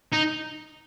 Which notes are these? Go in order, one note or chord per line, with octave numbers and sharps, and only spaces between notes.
D#4